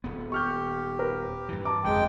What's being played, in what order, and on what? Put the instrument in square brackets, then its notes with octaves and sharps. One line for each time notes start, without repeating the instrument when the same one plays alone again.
[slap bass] D#1 B3
[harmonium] G4 [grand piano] C#6 F6 G6
[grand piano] A#4 B4
[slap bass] G2 E3
[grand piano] A5 A#5 D6
[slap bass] F#1 F2 D3 [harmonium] G#3 G5